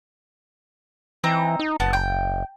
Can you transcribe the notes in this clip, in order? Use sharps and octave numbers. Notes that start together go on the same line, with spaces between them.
E3 C4 D#4 A#5
D#4
F#1 B3 A5
G5